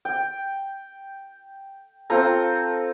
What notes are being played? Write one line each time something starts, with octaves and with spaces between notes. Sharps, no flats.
G5
C4 F4 A4 A#5